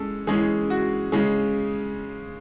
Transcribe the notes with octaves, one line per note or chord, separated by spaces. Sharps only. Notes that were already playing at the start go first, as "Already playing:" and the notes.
Already playing: G#3 C#4 A4
E3 G#3 C#4 G#4
F#4
C#3 G#3 C#4 G#4